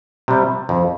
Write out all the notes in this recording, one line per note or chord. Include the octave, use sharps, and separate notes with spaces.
C3 G3
F2